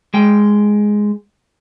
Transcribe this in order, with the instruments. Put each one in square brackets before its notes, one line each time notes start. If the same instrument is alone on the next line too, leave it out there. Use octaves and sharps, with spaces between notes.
[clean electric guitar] G#3 G5